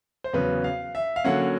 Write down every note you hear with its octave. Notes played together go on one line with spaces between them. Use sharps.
C5
E2 C#3 F#3 B3 B4
F5
E5
F5
D3 F#3 A#3 C#4 F#5